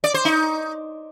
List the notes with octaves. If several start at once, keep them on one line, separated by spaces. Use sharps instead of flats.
D5
C5
D#4